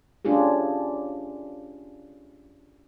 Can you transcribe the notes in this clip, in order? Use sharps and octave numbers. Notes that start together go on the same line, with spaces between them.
A3 C#4 D4 F4 G4 G#4